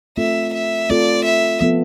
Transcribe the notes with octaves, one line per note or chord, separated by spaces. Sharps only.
A3 C4 F4 A4 E5
E5
A3 C4 F4 A4 D5
E5
F3 B3 F4 A4